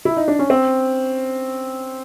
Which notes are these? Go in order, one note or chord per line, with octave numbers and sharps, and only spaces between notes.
E4
D#4
D4
C#4
C4